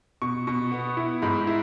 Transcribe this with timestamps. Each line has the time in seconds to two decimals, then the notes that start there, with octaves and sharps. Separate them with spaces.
0.22 B2 C#6
0.47 B2 C#6
0.72 B3
0.97 E4
1.22 G#2 B5
1.47 E4